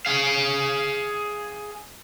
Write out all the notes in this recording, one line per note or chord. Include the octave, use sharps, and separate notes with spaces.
G#4 F5